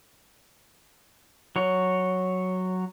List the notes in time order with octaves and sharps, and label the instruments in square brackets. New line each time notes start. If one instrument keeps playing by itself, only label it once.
[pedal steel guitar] F#3 C#5